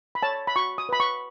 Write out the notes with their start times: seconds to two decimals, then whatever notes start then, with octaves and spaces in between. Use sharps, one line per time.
0.15 B5
0.23 C#5 A5
0.47 B5
0.56 F#4 C#6
0.78 D#6
0.89 B4 B5
1.00 C#6